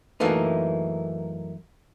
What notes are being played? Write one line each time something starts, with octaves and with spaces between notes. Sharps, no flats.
F#2 E3 A3 A#3 D#4